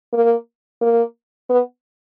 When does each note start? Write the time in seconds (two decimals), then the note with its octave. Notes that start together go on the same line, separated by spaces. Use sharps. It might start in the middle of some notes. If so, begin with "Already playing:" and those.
0.13 A#3
0.82 A#3
1.50 B3